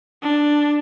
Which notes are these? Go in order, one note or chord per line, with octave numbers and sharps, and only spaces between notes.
D4